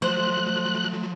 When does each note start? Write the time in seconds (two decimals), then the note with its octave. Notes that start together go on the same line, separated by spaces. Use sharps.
0.02 F3 F#3 A3 C5 F#6